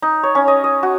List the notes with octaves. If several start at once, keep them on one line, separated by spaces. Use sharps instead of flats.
D#4
C#5
C#4
D#5
D#5
F#4